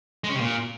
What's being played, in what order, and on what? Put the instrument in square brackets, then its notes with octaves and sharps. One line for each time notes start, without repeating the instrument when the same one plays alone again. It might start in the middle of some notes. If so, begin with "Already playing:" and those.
[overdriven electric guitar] G#3
C#4
C3
A#2